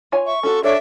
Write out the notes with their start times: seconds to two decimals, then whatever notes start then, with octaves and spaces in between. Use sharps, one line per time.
0.12 F4 C#5 G#5
0.26 E5 C#6
0.43 C#4 F4 F#4 A4
0.64 D4 A4 C#5 E5